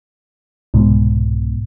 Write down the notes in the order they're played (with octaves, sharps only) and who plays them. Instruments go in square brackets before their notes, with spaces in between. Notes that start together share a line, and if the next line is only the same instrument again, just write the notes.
[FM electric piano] C2 G#2 B2